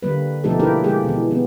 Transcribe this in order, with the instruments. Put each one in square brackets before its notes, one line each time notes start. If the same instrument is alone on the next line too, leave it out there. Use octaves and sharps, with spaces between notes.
[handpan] D3 G3 A#3 B4
B2 F3 A3 D#4 G4 A4
A#3 D4 E4 G4 A#4 B4
G#3 A#3 G4 G#4
B2 E3
E3 B3